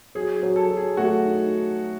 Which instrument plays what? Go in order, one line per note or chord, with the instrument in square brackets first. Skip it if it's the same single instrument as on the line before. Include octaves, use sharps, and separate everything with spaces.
[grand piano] F#3 [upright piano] G#4
[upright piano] G#4
[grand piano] F#3
[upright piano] A4
[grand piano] F#3
[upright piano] G#4
[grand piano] A3 [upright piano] F#4
[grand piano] D#4